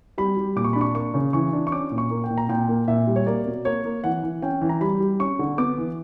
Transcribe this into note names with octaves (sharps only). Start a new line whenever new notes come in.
G3 B5
G3
A#2 D6
C#6
D4 B5
C#6
A#3 C#6
C#3
E3 C#6
D4
C#6
C#4 D6
A#2
C#6
A#3
G5
A#2
A#5
A#2 G5
A#3
A#2 E5
G3
C#5
A#3 D5
B2
A#3 C#5
A#3
E3 F#5
E3
C#4 G5
E3
A#5
G3 B5
G3
C#4 C#6
D3
B3 D6
E3